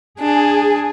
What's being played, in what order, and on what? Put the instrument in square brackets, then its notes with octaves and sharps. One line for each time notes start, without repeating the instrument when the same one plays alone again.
[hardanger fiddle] D4 [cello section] G#4